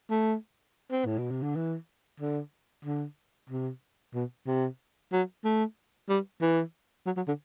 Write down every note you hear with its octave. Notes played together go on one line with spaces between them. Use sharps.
A3
C4
A2
B2
C3
D3
E3
D3
D3
C3
B2
C3
F#3
A3
G3
E3
F#3
F#3
D3